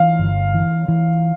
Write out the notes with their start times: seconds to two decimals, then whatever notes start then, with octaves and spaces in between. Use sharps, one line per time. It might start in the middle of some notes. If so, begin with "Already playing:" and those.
Already playing: E3 F5
0.19 G1
0.54 E3
0.88 E3